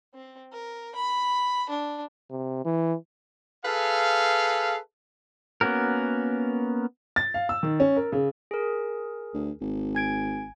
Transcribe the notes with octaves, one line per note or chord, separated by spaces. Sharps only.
C4
A#4
B5
D4
C3
E3
G#4 A4 B4 F5
A#3 B3 C#4 F#4 A#4
A6
F5
E6
D#3
C#4
A#4
C#3
G#4 A#4
D2
G#1
G#5 G#6 D7